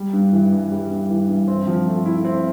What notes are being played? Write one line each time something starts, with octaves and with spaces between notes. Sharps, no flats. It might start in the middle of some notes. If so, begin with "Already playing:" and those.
Already playing: G3
G2
E3
G2
G3
G2
E3
G2
C4
F3
A3
E4
C4